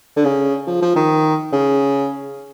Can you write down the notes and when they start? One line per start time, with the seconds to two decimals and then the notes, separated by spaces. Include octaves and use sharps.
0.17 D3
0.25 C#3
0.67 F3
0.82 F3
0.96 D#3
1.52 C#3